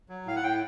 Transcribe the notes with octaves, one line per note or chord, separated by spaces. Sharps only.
F#3
A2 F5
F#5
A2 G5